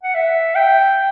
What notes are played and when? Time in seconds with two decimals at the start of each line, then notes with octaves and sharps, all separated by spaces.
0.03 F#5
0.15 E5
0.55 G5